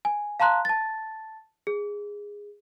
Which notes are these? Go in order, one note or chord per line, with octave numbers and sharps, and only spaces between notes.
G#5
F5 A5 A#5 C6 F#6
A5 A6
G#4